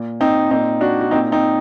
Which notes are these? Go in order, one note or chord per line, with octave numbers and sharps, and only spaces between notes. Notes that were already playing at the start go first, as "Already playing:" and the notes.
Already playing: A#2
C4 D#4
A#2 C4 D#4
D4 F#4
F#4
A#2 C4 D#4
C4 D#4